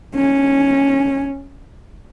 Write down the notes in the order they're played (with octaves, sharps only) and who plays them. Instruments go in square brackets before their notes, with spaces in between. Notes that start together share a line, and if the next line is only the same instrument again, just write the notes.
[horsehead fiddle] C#4